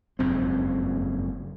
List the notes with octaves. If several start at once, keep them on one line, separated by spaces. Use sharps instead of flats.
F#1 F2 G#2 C4